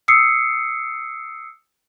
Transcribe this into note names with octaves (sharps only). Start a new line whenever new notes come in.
D#6 E6 C7 C#7